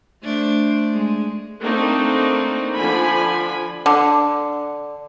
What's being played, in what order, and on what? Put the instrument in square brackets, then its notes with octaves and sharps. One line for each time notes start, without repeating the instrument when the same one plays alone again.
[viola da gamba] A3 D4 C5
G#3
[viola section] A3 A#3 C4 D4 D#4
D3 F3 G#5 B5
[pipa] D3